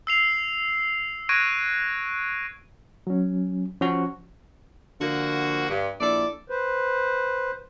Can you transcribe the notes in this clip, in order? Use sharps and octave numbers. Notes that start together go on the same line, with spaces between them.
E6 C7 F7
C#6 F#6 G#6 A#6 D7 D#7
F#3 C#4
F3 C#4 F#4
D3 F3 A#3 F#4
G2
A#1 E4 A4 D5
B4 C5